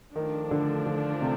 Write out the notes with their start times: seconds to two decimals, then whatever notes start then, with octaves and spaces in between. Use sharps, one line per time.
0.15 D#3 F3 A3 D4
0.51 D3
0.86 D3
1.21 C3